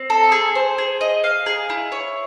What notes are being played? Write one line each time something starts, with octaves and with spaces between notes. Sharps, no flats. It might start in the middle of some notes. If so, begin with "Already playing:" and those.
Already playing: C4
A4
G#4
C5
G#4
D#5
F5
G#4
E4
C#5